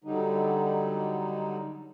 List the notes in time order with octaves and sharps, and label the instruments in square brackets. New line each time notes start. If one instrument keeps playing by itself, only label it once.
[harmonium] D3 F#3 G3 D#4